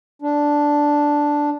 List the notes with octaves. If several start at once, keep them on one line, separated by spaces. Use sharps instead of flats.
D4